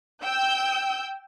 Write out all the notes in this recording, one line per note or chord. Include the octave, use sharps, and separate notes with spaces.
G5 E6 G6